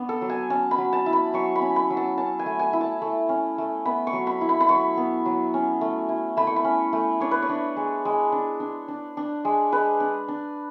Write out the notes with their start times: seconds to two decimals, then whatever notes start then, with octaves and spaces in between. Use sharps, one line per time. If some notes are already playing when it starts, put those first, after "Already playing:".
Already playing: B3 D4
0.09 A4
0.22 F#3
0.30 G#5
0.50 C#4 A5
0.71 B5
0.78 F#3
0.93 A5
1.06 E4
1.13 B5
1.34 F#3 C#6
1.56 B5
1.61 C#4
1.76 B5
1.90 F#3
1.97 A5
2.18 C#4 A5
2.39 G#5
2.46 A3
2.59 G#5
2.73 E4
2.81 A5
3.02 A3
3.29 C#4
3.58 A3
3.85 B3 B5
4.07 C#6
4.13 F#3
4.27 B5
4.41 E4
4.49 B5
4.61 B5
4.69 F#3 C#6
4.97 B3
5.26 F#3
5.54 C#4
5.81 A3
6.09 E4
6.37 A3 B5
6.47 C#6
6.56 B5
6.64 C#4
6.93 A3
7.20 D4 C#5
7.31 B4
7.42 C#5
7.49 D4
7.77 G#3
8.05 G#3
8.32 D4
8.60 D4
8.88 D4
9.17 D4
9.45 G#3
9.72 G#3 B4
10.00 D4
10.28 D4